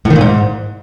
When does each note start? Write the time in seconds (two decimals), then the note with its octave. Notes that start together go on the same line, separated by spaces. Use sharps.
0.05 A2
0.10 D#3
0.16 A#2
0.21 G#2